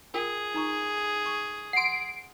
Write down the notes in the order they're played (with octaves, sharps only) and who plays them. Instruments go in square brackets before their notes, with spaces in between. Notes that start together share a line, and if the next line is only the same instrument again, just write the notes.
[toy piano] F4 A#4 G5 [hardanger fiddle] G#4
[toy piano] D#4 A#5 C#6
C#6
[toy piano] F#5 C6 [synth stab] C7 D7